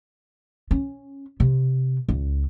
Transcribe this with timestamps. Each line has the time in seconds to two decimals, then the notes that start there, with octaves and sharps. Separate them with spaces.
0.71 C#4
1.40 C3
2.09 C#2